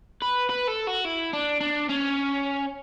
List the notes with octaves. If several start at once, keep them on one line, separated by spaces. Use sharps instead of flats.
B4
B4
A4
F#4
E4
D4
D4
C#4